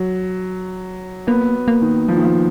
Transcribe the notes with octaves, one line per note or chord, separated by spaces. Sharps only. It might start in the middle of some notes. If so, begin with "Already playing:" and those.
Already playing: F#3
A#3 B3
A#3
D#3
F3
D#3
F3